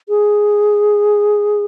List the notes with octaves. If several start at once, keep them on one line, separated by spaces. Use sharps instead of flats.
G#4